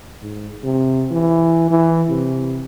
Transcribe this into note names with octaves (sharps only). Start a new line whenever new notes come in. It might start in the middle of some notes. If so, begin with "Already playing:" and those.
G#2
C3
E3
E3
C3